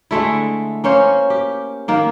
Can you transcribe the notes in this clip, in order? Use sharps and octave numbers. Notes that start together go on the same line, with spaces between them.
D3 G#3 A3 E4
A#3 C#4 C5 C#5
G4
D#3 A#3